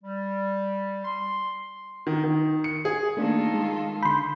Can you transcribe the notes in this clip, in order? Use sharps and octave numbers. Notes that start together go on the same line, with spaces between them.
G3
C6
D#3
D#3
C#7
G#4
D#3 A3 A#3 D4 F4 A4
G#3
D3 B5 C6 G6